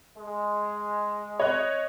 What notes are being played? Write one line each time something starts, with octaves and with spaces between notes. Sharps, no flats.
G#3
C#5 D#5 F#6